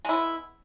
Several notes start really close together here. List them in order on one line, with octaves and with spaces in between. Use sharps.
G#3 E4 B3